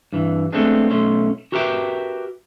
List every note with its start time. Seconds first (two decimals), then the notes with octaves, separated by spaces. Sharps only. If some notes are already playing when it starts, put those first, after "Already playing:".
0.13 G2 E3
0.52 G#3 A3 B3 C4 D4 G#4
0.90 B1 A3 C#4 C6
1.52 F#4 G4 A#4 B4 E5 G5